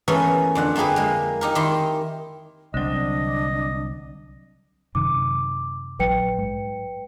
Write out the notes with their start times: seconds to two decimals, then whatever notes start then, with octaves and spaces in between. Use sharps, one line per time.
0.08 E3 A3 B3 C#4 G#4 A#4
0.55 F2 D3 F#5
0.76 A3 A#3 G4 G#4 B4
0.96 G#3 A#3
1.41 D#4 G4 A#4
1.55 D#3 E4 G4 D#5 C6
2.74 C2 D3 F#3 C4 D4 D#5
4.95 F#2 C3 D#3 D6
5.99 A#1 F#3 B4 G5 C#7
6.38 G#2